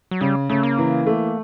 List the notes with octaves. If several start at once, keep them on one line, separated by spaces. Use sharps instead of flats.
F#3
C#3 G3
C#3 A3
A#3
E3
A3